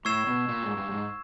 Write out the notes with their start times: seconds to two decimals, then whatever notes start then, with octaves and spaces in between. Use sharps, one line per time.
0.05 A2 C#6 E6 G#6 C7 E7
0.27 B2
0.48 A#2
0.63 G#2
0.77 G2
0.91 G#2